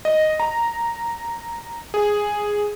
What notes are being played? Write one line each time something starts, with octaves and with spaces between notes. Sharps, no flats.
D#5
A#5
G#4